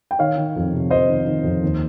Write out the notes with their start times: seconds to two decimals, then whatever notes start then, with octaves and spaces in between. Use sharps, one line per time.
0.11 G5
0.19 D#3 C#5 F5
0.38 D#3
0.56 F2
0.73 C3
0.91 F2 C5 D#5
1.09 D#3
1.26 D#3
1.44 F2
1.63 D#2